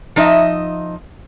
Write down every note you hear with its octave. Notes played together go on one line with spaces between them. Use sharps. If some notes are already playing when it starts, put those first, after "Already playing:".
F3 D#4 D#5 E5